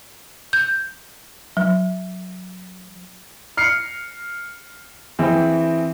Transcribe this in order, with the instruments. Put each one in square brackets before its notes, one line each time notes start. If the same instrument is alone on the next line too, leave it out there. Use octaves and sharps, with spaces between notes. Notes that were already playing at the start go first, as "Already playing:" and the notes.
[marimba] G6
F#3
[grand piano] F6 C7 C#7
E3 C4 G#4